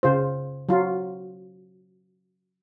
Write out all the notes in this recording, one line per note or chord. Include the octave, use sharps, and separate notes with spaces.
C#3 F4 C5
F#3 F4